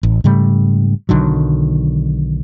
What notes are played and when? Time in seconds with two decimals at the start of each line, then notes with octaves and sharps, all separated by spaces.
0.03 A1
0.24 G#2 C#3 G3 A3
1.09 B1 D3 D#3 F#3